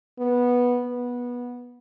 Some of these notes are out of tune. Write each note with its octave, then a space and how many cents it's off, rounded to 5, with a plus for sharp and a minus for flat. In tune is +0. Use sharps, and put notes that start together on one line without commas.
B3 -10
B3 -15